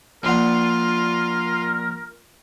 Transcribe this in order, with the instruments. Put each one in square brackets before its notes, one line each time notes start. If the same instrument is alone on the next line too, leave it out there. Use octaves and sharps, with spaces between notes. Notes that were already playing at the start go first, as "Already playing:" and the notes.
[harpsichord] A#1 D4 F#5 [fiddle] F4 [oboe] A#4